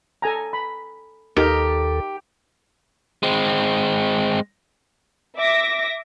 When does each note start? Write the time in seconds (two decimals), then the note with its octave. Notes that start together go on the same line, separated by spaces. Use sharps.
0.22 A4 G#5 A#5
0.53 B5
1.37 D#2 D#4 G4 A4 A#4
3.23 G#3 C4
5.37 E5 D6 A#6